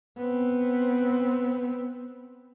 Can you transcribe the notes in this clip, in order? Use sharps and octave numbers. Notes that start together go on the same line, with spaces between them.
B3 C4